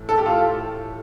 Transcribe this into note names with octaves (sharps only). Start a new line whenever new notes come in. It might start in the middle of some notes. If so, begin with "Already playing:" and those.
Already playing: A2 E3 A3
A4
G4
F4 A4